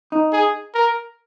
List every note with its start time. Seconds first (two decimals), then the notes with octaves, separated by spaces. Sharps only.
0.12 D#4
0.33 G#4
0.74 A#4